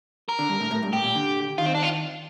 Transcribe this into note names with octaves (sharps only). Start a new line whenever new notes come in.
A#4
D3
G2
A2
A2
G2
A2 G4
A#2
D3
D#3 F4
C4
D4
F4